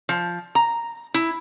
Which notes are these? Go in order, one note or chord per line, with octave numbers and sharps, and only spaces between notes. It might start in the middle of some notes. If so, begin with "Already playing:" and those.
F3
A#5
E4